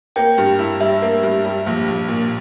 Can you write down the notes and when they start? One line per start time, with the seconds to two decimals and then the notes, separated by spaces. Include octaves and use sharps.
0.16 A#3 G5
0.38 G2
0.59 E4
0.80 G3 E5
1.02 A#3
1.23 G2
1.45 G3
1.67 A#1
1.88 A#1
2.09 A#2